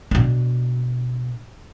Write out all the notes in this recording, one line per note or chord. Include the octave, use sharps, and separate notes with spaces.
B2 D4